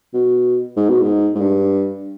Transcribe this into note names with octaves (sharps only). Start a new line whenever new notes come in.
B2
G#2
B2
G#2
G#2
G2